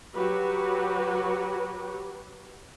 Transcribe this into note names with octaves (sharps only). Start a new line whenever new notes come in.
F#3 F#4 G4 B4